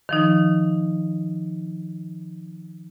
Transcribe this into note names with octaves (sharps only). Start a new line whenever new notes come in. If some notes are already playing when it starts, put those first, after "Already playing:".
D#3 F3 D#4